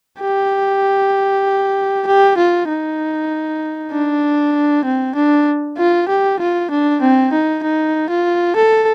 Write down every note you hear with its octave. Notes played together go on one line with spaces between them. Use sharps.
G4
G4
F4
D#4
D4
C4
D4
F4
G4
F4
D4
C4
D#4
D#4
F4
A4